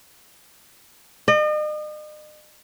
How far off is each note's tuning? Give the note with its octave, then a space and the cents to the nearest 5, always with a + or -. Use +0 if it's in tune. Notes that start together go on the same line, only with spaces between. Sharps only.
D#5 -40